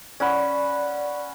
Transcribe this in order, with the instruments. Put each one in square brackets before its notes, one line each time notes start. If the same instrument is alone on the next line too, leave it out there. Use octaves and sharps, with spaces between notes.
[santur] C#4 F#5 B5 [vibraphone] D5